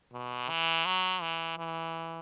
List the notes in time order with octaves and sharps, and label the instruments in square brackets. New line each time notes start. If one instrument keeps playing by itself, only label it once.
[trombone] B2
E3
F#3
E3
E3